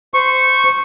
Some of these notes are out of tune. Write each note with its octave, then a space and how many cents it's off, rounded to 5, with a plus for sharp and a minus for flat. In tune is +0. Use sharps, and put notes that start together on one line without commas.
C5 -20 C#6 -10